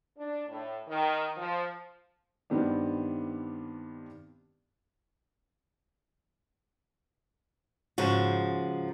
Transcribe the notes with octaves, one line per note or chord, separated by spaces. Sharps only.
D4
A2
D#3
F3
G2 D#3 B3 C4 D4
G#2 C#3 F3 F#4